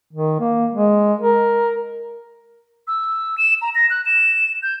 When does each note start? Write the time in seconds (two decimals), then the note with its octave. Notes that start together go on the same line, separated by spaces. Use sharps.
0.13 D#3
0.40 A#3
0.72 G#3
1.21 A#4
2.88 E6
3.38 E7
3.62 A#5
3.75 A#6
3.90 F#6
4.06 E7
4.63 G6